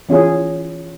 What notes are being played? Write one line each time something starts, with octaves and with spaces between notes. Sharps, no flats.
E3 C#4 F4 G#4